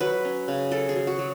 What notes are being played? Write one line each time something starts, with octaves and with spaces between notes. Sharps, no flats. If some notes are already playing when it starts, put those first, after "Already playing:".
F#3 B4
C#4
C#3
F#3 A4
G#4
F#3
F#4
F#3